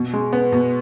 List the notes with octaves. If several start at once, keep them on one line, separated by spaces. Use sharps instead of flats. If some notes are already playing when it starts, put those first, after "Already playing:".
Already playing: B2
G#3
B3
B2